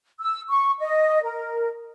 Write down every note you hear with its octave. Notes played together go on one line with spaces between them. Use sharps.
E6
C#6
D#5
A#4